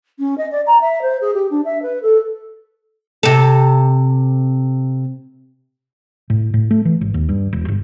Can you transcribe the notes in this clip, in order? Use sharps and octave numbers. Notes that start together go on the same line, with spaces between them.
C#4
D#5
D5
A#5
E5
C5
G#4
G4
D4
E5
B4
A4
C3 A4
A2
A2
A3
E3
G#1
D#2
G2
E1
G1